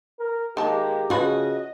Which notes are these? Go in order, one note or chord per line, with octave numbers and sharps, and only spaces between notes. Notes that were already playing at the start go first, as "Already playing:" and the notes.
A#4
D#3 G#3 A#3 G4 A5
C#3 F3 F4 F#4 B4 D#5